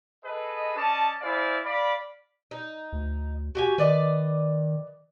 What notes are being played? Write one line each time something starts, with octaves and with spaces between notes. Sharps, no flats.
G#4 A4 B4 D#5
C#4 D5 D#5 A5
E4 G#4 C5 D5 F5
D5 F5 B5
D#4
D2
F#4 G4 G#5
D#3 B4 D5 D#5